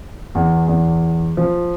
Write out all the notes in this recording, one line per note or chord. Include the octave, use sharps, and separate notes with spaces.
E2
E2
F3